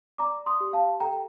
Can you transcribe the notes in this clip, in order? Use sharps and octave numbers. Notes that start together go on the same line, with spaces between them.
D5 A#5 D6
C6 D#6
G4
F5 A5
A4 G5 A#5